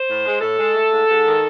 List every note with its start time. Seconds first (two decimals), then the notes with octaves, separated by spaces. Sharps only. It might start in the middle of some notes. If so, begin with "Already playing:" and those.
Already playing: C5
0.08 A2
0.25 G#3
0.41 A2 A4
0.58 G#3
0.74 A3
0.91 G#2
1.08 G#2
1.25 D#3